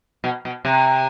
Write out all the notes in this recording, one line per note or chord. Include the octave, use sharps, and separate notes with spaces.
B2
B2
C3